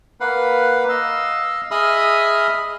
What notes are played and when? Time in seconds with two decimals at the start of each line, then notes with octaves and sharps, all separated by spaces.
0.20 A#3 B4 F5 F#5
0.89 D#5 F5 E6
1.71 G#4 D#5 E5 B5 D#6 F6